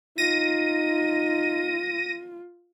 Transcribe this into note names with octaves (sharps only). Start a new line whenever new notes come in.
D#4 F4 A#6 D#7